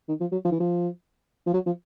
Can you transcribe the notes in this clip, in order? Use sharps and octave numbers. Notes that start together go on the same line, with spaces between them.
D#3
F3
F#3
F3
E3
F3
F3
F#3
F3